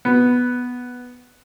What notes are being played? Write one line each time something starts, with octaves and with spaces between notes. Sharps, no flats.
B3